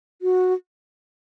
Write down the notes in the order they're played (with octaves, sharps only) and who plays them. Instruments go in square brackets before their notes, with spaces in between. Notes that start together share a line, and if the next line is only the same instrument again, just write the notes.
[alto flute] F#4